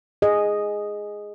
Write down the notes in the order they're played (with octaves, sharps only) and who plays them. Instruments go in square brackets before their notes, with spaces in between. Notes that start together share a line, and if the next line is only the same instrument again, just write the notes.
[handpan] G#4 D#5